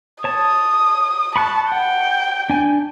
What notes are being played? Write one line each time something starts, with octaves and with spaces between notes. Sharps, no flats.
C#5 A5 D#6
A5 B5 C#6 F#6
F#5 G5
D4 G#5